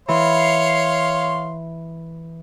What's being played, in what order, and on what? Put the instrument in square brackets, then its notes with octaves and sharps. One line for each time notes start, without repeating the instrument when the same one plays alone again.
[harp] E3 [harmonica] C#5 F5 C6